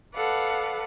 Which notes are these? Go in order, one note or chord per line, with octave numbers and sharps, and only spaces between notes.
A4 B4 D5 F5 F#5